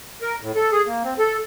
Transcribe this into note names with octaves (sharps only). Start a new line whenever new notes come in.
A#4
A2
A4
G#4
A#3
C4
A4